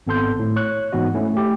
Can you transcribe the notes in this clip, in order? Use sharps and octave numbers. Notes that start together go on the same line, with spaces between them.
G#1 B3 C4 A4 C6 G6
A2
C#5 C#6 F#6
G#2 E3 B3 F#4 D#5
A3 C#4 E4
A3 G4